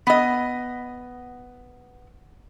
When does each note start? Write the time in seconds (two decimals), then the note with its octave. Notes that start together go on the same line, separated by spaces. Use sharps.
0.07 B3 D#5